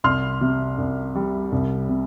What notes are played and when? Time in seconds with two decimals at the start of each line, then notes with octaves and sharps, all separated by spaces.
0.04 C2 C6 F6
0.41 C3
0.78 C2
1.15 G3
1.52 C2
1.89 C3